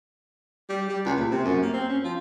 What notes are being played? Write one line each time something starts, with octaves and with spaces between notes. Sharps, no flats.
G3
G3
C#2
A#2
C3
F#2
A#3
C4
C#4
F3